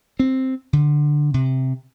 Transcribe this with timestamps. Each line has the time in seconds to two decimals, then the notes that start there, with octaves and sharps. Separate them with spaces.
0.20 C4
0.73 D3
1.34 C3